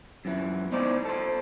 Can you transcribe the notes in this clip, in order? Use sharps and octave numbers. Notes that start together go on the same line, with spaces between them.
F#2 E3
B3 D#4 C5 D5
A4 C5